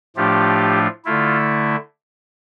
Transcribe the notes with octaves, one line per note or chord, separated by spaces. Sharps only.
A2 F3 A3 D4 F4 G4
D3 A3 E4 F4